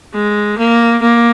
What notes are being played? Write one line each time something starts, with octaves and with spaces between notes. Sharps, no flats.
G#3
A#3
A#3